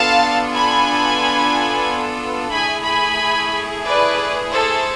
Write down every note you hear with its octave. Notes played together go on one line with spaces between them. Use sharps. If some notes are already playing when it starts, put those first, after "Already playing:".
Already playing: B3 D4 F4 A4 F5 A5
G#5 B5
A3 E4 G#4 G#5 B5
G#5 B5
B4 D5
A4 C5